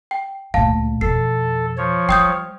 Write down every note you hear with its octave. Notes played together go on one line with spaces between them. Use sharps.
G5
D2 A#2 F5 A5
F2 B2 A4 C7
F3 C#5
G3 G5 D#6 G6